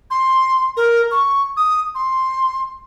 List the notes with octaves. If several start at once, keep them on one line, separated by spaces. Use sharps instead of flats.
C6
A#4
C#6
D#6
C6